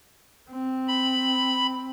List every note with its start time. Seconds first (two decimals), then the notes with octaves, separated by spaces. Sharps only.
0.50 C4
0.88 B5